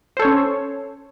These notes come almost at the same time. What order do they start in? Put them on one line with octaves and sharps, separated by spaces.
C5 A4 C#5 C#4